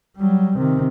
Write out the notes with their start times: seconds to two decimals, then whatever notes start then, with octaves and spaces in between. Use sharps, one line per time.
0.18 F#3 G3
0.58 C3 D#3